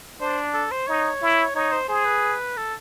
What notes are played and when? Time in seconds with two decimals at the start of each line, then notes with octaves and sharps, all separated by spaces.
0.20 D4 C5
0.54 A4
0.71 C5
0.88 D#4 C#5
1.22 E4
1.55 D#4 C#5
1.72 C5
1.89 G#4 C5
2.05 B4
2.57 A4